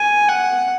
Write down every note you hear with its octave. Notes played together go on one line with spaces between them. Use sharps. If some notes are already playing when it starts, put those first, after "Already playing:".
Already playing: G#5
F#5